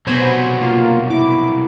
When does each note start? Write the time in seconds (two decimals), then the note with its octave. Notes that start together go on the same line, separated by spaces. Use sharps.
0.07 C2 B2 F#3 B3 C5 G#5 B5
0.61 A#3 F4
1.10 E4 D6